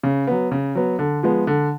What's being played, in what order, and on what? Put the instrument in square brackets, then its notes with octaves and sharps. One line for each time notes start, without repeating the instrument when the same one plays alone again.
[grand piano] C#3
F#3 B3
C#3
F#3 B3
D3
F3 G#3 B3
D3